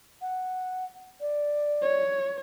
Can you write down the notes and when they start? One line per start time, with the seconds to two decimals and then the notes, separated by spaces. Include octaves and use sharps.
0.21 F#5
1.21 D5
1.82 C#5